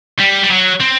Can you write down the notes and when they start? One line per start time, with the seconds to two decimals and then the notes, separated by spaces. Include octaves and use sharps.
0.18 G3
0.44 G3
0.50 F#3
0.81 C4